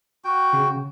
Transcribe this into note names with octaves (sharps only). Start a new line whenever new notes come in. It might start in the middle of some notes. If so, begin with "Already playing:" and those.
F#4 G5
C#3